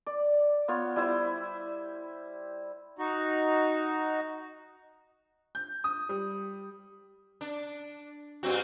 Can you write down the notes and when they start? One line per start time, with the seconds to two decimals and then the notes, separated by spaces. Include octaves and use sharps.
0.07 D5
0.68 B3 F4 C#5
0.96 G3 E4 C5
2.98 D#4 F#4
5.55 G6
5.84 D#6
6.09 G3
7.41 D4
8.43 G2 C4 F#4